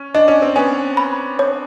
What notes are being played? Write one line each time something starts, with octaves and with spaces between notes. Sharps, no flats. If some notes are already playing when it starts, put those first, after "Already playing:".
Already playing: C#4
D4 D#5
C#4
C4
B3 C#4 G#5
B5
C#5